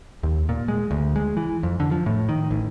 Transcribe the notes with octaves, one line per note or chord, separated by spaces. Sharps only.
D#2
A#2
G#3
D2
G#3
E3
F2
D3
F3
A2
D#3
A1